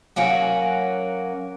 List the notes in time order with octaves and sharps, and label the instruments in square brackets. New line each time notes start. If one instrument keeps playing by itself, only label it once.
[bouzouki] F#3 A#3 C#4 F#4